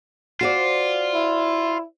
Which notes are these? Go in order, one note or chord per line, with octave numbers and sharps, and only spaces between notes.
F4 F#4 C5 D5
E4